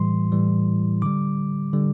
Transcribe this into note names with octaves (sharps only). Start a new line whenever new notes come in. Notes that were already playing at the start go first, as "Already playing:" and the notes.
Already playing: A2 E3 G3 C6
A2 E3 G3
D3 G3 D6
D3 G3